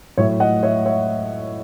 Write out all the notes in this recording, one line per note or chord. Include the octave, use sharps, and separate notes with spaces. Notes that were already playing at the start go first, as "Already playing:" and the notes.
A2 F#3 C#5 E5
D#5 F#5
C#5 E5
C#5 E5